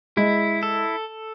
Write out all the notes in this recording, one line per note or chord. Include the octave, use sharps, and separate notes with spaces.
G#3 E4
A4